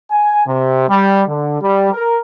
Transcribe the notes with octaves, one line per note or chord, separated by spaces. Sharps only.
G#5
C3
G3
D3
G3
A#4